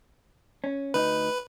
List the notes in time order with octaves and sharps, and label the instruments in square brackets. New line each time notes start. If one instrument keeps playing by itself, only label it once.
[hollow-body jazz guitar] C#4
[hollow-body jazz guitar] D2 D#4 [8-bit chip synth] B4